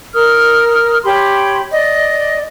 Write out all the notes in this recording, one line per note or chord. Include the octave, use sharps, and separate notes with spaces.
A#4 D#6 F6
G4 C#5 B5 C6
D5 D#5